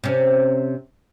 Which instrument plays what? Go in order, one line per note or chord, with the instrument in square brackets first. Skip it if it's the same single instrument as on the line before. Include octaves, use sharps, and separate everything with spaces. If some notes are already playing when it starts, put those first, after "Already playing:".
[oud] C3 C#4